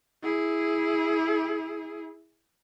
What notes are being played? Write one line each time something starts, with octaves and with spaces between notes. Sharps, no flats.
E4 G#4